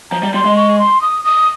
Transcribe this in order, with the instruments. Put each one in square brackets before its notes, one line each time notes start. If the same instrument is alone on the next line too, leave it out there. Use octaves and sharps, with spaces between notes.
[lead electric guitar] F3 [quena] A#5
[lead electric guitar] G3
[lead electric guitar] G3 [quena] C6
[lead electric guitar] G#3
[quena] C#6
C6
D#6
D#6